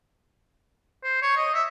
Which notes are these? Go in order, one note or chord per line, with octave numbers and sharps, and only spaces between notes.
C5
C#5
D#5
E5